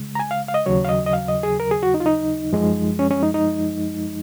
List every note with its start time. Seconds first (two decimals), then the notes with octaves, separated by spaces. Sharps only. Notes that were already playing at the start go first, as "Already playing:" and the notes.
Already playing: C#3 G#3
0.15 A#5
0.20 G#5
0.31 F5
0.48 F5
0.54 D#5
0.66 D#2 C#3 F#3 C#5
0.85 F5
0.89 D#5
1.06 D#5
1.13 F5
1.28 D#5
1.43 G#4
1.60 A#4
1.71 G#4
1.83 F#4
1.94 D#4
2.00 F4
2.06 D#4
2.53 F#2 F3 G#3
2.99 C#4
3.11 C#4
3.23 D#4
3.34 D#4